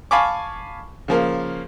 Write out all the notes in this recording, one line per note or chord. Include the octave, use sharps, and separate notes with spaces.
F5 G#5 A5 B5 C#6 D6
C#3 F3 A#3